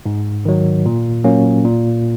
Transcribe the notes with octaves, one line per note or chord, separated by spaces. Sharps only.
G#2
D#3 F#3
A#2
F#3 A#3 C#4
A#2